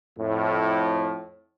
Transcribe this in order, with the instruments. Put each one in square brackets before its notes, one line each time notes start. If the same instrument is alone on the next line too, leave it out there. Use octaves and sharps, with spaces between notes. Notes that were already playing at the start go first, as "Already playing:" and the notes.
[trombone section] F2 A2